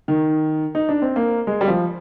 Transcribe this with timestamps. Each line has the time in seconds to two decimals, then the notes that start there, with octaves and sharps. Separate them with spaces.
0.08 D#3
0.75 D#4
0.89 D4
1.02 C4
1.16 A#3
1.47 G#3
1.61 G3
1.68 F3